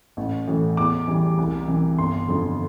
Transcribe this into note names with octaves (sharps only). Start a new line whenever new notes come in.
A1
A2 E3
E2 D6
E3 G3
C2
C3 E3
G1 C6
F2 D3 F3